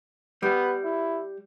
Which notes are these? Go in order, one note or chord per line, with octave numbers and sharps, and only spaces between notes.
G3 B3
E4